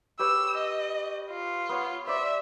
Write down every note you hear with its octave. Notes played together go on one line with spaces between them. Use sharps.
G4 B4 C#5 E6
D#5
F4
B3 C#5
C5 D5 E5 B5